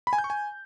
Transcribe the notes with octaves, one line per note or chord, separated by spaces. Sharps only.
B5
G#5
G6
C#6
G#5